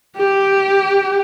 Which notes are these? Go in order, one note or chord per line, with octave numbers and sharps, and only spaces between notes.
G4